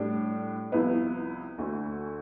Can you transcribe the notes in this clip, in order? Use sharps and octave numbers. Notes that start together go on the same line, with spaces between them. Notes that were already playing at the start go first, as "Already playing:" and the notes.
Already playing: A2 G3 D4
C2 C3 F3 B3 E4
D2 D3 A3